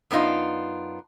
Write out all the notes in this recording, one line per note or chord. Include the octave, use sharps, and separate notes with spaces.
F#2 B3 D4 D#4 F4